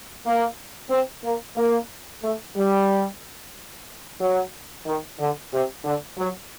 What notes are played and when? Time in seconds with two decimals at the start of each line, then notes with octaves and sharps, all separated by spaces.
0.25 A#3
0.90 C4
1.24 A#3
1.56 A#3
2.23 A3
2.56 G3
4.20 F#3
4.86 D#3
5.19 D3
5.52 C3
5.84 D3
6.17 F#3